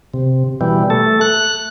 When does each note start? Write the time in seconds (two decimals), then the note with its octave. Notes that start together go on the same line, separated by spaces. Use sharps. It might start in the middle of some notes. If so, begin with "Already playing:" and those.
0.14 C3
0.61 B2 E3 G3
0.90 A3 A4
1.21 F#6